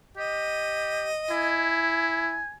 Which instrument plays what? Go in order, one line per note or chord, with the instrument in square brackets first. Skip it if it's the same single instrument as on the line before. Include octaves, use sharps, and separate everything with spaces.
[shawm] G4 [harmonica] D#5
[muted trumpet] E4 [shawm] G#5